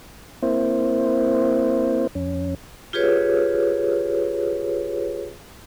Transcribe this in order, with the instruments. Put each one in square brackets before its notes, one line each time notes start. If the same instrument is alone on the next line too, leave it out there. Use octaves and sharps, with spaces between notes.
[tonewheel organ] A#3 C4 E4 C5
F2 C#4
[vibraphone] F4 G4 G#4 B4 C#5